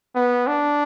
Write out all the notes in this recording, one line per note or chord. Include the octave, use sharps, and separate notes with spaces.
B3
D4